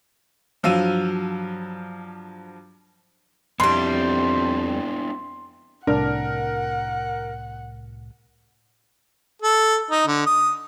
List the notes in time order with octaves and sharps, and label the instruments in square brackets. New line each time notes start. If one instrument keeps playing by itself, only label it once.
[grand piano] G2 F3 F#3 F5 E6 D#7
[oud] F2 G3 [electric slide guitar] B3 D4 E4 [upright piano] C6
[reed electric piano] C2 A2 F6 [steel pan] D4 [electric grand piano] A#4 [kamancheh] F#5
[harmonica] A4
D#4
D3
D#6